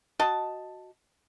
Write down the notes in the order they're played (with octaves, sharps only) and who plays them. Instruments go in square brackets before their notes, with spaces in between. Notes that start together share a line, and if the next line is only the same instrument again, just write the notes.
[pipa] F#4 D#5 A5